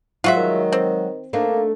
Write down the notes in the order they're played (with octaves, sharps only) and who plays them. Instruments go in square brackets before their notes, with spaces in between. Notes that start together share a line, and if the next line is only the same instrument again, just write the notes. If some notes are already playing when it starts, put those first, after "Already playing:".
[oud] F#3 G#3 [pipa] F4 F#4 E5
[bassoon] D#3
[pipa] C4
[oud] A3 D4 D#4 [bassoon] A#3